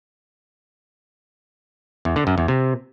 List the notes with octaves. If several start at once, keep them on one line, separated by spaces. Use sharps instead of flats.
E2
D3
F#2
E2
C3